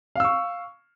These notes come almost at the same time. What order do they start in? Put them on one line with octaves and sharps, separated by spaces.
F5 E6 C#6